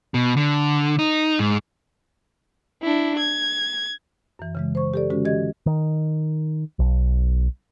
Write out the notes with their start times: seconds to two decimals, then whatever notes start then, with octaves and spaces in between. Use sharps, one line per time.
0.14 B2
0.37 D3
0.99 D#4
1.39 G#2
2.82 D4 E4
3.19 G#6
4.39 F#2 E3
4.55 C#3 E3 G#3
4.75 C5 C#6
4.94 G4 A4 D5
5.10 D3 G#3 C#4 F#4
5.25 E3 G4 D#5 G#6
5.66 D#3
6.79 B1